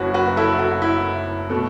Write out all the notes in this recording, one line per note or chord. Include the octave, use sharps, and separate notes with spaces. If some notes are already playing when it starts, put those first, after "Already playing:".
Already playing: F#1 F#2 E4 F#4 B4 C#5
F#4 B4
E4 A4
F#4
E4
B2 A3